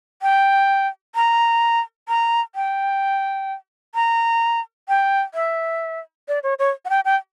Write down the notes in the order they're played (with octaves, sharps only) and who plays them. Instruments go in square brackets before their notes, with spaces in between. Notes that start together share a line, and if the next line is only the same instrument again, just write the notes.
[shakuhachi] G5
A#5
A#5
G5
A#5
G5
E5
D5
C#5
C#5
F#5
G5
G5